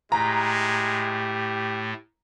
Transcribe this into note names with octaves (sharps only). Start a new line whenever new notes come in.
A2 G#3 A3 G4 A#5